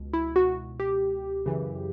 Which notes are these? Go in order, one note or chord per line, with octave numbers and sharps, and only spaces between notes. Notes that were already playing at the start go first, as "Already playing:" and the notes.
Already playing: C#2 B2
E4
F#4
G4
F#2 C#3 E3